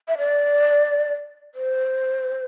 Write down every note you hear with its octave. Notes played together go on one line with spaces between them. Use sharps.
E5
D5
C5